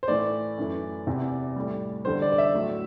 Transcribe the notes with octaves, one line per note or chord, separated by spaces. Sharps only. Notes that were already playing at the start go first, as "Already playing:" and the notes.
C5
A2 E3 A3 D5
F#2 E3 A3
E2 C3 E3
A2 G3
E2 D3 G3 C5
D5
D5
E5
A2 F#3 A3